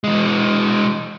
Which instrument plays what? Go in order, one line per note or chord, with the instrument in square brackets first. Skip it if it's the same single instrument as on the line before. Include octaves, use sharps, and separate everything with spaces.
[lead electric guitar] E3 G#3